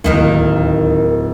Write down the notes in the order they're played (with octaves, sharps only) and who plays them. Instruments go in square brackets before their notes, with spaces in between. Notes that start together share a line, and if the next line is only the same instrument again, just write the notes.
[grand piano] D1 [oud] D#2 D#3 A#3